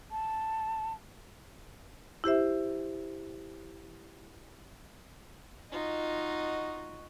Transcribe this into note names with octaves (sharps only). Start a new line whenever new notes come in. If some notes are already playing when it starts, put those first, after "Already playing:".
A5
E4 G4 C5 E5
D#4 F4 F#4 D#5